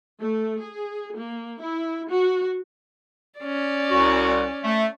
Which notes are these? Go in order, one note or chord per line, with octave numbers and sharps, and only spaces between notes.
A3
G#4
A#3
E4
F#4
C#4 D5
C2 F#4
A3